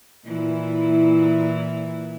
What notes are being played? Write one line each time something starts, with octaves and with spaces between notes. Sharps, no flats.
A#2 E3 E4